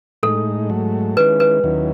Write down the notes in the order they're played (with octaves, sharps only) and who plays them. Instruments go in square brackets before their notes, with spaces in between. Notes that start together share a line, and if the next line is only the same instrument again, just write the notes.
[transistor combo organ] A2 G#3 D#4 [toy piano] A4
[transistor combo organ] G#2 F#3 A3
[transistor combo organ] D#3 G#3 C#4 E4 [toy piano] B4
[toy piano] B4
[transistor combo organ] D#2 D#3 F#3 C#4 E4